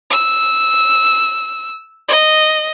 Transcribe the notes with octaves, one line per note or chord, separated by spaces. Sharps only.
E6
D#5